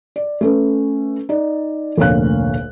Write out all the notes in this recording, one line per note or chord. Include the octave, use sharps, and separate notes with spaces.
D5
A3 C#4 B4
D#4 D5
F1 D2 A#2 C#5 F5 F#6